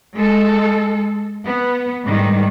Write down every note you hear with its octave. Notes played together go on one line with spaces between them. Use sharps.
G#3 A4
B3
G#2 D#3 G3